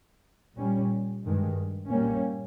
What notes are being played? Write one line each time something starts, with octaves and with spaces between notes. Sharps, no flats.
A#2 G3 C#4
G2 D#3 G#3
A#2 G3 A#3 C#4